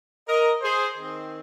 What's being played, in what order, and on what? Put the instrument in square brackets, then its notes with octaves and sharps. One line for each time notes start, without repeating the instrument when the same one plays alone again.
[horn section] A#4 D#5
G#4 C5
D#3 C4